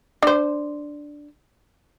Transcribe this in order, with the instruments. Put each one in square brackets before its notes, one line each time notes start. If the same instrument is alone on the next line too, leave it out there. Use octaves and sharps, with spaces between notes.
[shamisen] D4 C5